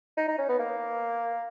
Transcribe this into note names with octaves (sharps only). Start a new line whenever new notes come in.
D#4
D#4
C#4
B3
A#3